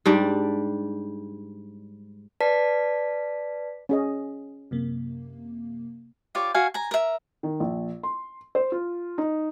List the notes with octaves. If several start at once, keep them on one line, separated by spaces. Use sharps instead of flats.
G#2 G3 D4
B4 D5 A5 B6
C#4 G#4 D#5
F#2 C3 A#3
F4 G4 C#5 D5
F#4 F5 G#5
G#5 A#5
A#4 E5
D#3
A#1
C6
C5
F4
D#4